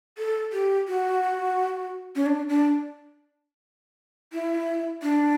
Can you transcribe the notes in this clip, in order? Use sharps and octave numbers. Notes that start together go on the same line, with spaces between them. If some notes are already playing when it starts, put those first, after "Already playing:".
A4
G4
F#4
C#4
D4
D4
E4
D4